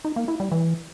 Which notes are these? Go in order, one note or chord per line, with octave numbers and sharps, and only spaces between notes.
D#4
A#3
E4
G3
E3